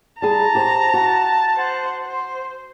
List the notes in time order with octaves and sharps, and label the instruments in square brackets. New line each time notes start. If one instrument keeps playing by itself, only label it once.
[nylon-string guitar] G3 G#4 [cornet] A5 [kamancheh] A#5
[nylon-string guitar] G4 C5
F#4
[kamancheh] C5 F#5
C5